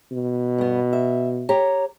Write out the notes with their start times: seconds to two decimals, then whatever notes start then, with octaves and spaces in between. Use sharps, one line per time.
0.12 B2
0.58 G2 B3
0.93 E5
1.49 G4 C#5 A#5